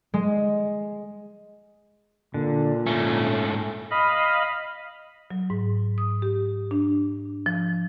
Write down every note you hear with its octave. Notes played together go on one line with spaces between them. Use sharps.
G#3
A#2 D3
G#2 A3 C#4
D#5 F5 B5
F#3
G#2
D#6
G4
D4
F3